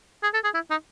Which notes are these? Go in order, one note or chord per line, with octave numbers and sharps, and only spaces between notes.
G#4
A4
G#4
E4
D#4